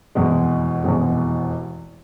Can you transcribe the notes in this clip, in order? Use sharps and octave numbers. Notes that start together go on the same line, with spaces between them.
F1 E2 B2 G#3
F1 E2 B2 G#3